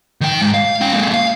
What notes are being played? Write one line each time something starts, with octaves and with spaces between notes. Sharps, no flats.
D#3 G5
G#2
F5
C#4 G5
G#3 A#3
F5